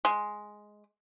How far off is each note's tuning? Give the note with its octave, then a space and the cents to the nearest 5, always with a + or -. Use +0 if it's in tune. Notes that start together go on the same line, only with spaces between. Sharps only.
G#3 +5